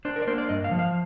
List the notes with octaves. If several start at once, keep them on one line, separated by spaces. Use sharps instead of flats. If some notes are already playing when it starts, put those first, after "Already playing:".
D4 C5
A#4
D5
A#3 C5
D5
G2 D#5
F5
F3
F5